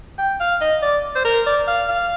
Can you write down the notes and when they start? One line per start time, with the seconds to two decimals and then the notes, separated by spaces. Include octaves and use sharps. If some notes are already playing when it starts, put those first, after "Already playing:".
0.18 G5
0.40 F5
0.61 D#5
0.82 D5
1.16 C5
1.25 A#4
1.46 D5
1.68 F5
1.88 F5